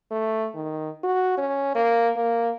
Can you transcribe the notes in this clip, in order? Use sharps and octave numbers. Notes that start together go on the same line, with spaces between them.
A3
D#3
F#4
C#4
A#3
A#3